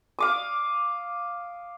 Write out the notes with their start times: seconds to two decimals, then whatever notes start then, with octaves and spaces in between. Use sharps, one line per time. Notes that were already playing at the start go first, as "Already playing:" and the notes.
0.19 F5 D6 D#6